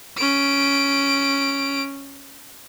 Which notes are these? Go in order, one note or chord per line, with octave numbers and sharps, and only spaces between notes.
C#4 D7